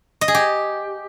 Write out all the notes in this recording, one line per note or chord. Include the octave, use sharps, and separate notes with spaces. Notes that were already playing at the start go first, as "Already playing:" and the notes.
D#5
G#4
G4